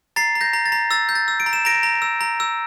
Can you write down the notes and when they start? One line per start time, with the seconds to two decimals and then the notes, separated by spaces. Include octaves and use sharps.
0.16 A#5 A6 C7
0.35 A#5
0.41 G6 A#6
0.53 A#5
0.66 A6
0.72 A#5
0.91 E6 A6
1.09 G6
1.15 A6
1.28 E6
1.40 D7
1.46 A#5
1.53 E7
1.65 A#5 A#6 D7
1.83 A#5
2.02 E6
2.21 A#5
2.40 E6